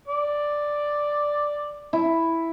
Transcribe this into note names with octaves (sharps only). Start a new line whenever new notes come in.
D5
E4